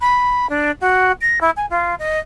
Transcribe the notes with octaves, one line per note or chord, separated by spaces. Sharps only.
B5
D4
F#4
A#6
E4
G#5
F4
D#5